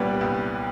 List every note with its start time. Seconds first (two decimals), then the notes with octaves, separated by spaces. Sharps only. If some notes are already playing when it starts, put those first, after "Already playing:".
Already playing: C2 A#2 G3 B3 D4 B4 C#5
0.21 C2